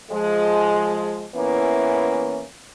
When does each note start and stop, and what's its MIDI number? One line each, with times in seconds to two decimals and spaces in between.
0.11 1.27 53
0.11 1.27 56
1.34 2.43 52
1.34 2.43 58
1.34 2.43 59
1.34 2.43 61
1.34 2.43 64